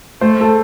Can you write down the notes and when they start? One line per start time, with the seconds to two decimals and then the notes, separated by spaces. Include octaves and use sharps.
0.21 A3 C5
0.41 A4